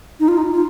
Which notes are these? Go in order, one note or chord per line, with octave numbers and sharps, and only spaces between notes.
D#4
F4
D#4
F4